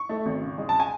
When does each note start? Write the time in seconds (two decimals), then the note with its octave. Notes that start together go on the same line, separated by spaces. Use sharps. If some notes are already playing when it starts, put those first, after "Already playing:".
Already playing: C#6
0.09 A3
0.26 G#1
0.41 C#3
0.58 G#3
0.69 A5
0.80 G#5